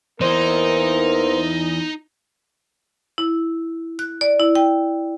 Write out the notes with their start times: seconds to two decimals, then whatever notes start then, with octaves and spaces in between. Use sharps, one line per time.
0.21 E2 E3 A#3 B3 D#4 A#4 C5
3.18 E4
3.99 F#6
4.21 D5
4.40 E4
4.55 G5